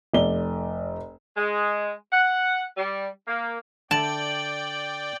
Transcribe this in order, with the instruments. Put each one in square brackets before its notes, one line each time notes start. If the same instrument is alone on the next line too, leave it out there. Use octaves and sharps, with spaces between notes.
[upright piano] F1 D5 G7
[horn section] G#3
F#5
G3
A#3
[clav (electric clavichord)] D3 E5 [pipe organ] D5 G5 [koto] A5 [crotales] D7 F#7